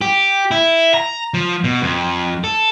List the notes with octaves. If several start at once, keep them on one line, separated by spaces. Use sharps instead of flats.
G4
E4
A#5
F3
B2
F2
A4